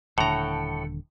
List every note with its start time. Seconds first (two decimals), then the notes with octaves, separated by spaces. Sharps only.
0.18 D#1 A2 D3 A4 F#5 G5 A#5